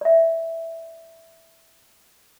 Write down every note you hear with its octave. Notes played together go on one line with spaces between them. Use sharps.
D5 E5